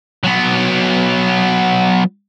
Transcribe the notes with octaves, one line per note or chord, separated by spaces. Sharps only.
F#3 B3